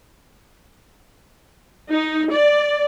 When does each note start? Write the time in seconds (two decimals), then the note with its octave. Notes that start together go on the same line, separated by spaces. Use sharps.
1.90 D#4
2.31 D5